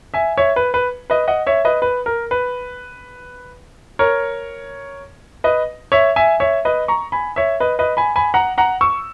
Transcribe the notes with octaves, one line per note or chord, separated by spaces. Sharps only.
E5 G#5
C#5 E5
B4
B4
B4 D#5
D#5 F#5
C#5 E5
B4 D#5
B4
A#4
B4
A#4 C#5
B4 D#5
C#5 E5
E5 G#5
C#5 E5
B4 D#5
A#5 C#6
G#5 B5
C#5 E5
B4 D#5
B4 D#5
G#5 B5
G#5 B5
F#5 A#5
F#5 A#5
C#6 E6